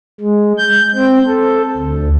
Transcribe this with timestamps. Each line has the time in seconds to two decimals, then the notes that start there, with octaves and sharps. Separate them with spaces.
0.20 G#3
0.58 G6
0.95 C4
1.27 A4
1.77 D2